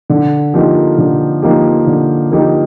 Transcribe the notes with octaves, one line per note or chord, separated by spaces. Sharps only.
D3
F3 A#3 D#4 G4
D3
F3 A#3 D#4 G4
D3
F3 A#3 D#4 G4